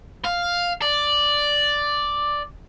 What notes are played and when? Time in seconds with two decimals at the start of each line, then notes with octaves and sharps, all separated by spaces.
0.25 F5
0.82 D5